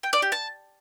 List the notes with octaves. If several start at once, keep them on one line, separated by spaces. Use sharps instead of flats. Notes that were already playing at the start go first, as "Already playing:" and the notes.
G5
D5
G4
A5